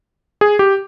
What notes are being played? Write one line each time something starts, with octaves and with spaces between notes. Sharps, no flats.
G#4
G4